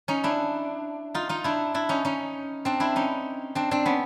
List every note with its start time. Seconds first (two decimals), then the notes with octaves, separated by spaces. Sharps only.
0.08 C#4 D#4
0.24 D4 E4
1.14 D#4 F4
1.29 D#4 F4
1.44 D4 E4
1.74 D4 E4
1.89 C#4 D#4
2.05 C#4 D#4
2.65 C4 D4
2.80 D4 E4
2.96 C#4 D#4
3.55 C4 D4
3.71 C4 D4
3.85 B3 C#4